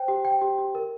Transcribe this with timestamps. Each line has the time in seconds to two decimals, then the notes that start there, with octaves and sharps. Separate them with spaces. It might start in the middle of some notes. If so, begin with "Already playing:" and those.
Already playing: C5 G5
0.08 G4
0.25 G5
0.42 G4
0.58 G4
0.75 A#4